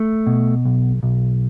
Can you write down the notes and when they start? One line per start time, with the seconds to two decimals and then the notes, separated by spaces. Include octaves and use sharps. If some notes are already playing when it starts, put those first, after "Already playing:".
Already playing: A3
0.27 B2
0.65 B1
1.03 B1